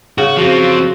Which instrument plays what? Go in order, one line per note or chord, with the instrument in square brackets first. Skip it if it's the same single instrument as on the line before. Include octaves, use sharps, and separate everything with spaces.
[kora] C#3 [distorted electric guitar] F#4
[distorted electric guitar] F3 C4 [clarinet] F#4